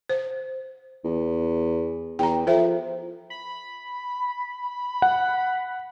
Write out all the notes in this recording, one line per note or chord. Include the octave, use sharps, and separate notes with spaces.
C5
E2
E2 G5 A#5
F3 A4 C5 E5
B5
F#5